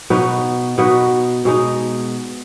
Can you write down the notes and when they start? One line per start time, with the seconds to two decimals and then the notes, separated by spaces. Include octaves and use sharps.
0.10 B2 B3 D#4 F#4
0.78 B2 B3 D#4 F#4
1.45 B2 G#3 D#4